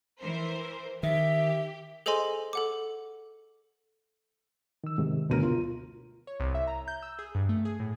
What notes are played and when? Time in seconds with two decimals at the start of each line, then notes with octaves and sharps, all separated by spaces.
0.21 E3 A#4 C5
1.03 D#3 G4 E5
2.06 G#4 A4 C5 D#5 G#5 C6
2.53 A4 F#5 D6
4.84 D#3 E6
4.98 G#2 C3 D#3
5.30 G1 D2 B2 A#4 D#7
5.43 F4
6.27 C#5
6.40 C2
6.55 E5
6.67 A#5
6.88 G6
7.03 E6
7.19 G#4
7.35 G2
7.49 A3
7.65 G#4
7.80 A2